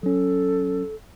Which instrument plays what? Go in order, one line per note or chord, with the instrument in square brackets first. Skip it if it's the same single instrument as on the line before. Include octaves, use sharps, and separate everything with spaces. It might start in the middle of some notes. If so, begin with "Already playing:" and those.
[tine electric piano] F#3 C#4 [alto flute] A4